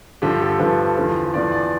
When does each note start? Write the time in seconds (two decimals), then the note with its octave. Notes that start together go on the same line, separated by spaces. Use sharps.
0.22 G2 D3 F3 G4
0.41 A4
0.59 G2 D3 F3 B4
0.97 E2 D3 F3
1.34 E2 D3 F3 D5
1.52 D5